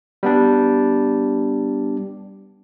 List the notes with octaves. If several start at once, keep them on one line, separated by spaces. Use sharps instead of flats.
G3 B3 D4